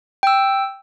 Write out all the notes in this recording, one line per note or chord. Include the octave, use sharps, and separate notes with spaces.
G5 E6